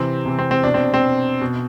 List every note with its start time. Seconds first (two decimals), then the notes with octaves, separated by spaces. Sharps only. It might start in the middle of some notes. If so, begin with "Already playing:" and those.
Already playing: C3 E3 C4
0.25 C3 E3
0.38 C4
0.51 C4
0.63 B2 D4
0.74 C4
0.94 C4
1.03 B2
1.41 B2